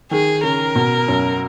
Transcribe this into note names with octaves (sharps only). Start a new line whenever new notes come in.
D#3 G#4
C#3 A#4
B2
F#2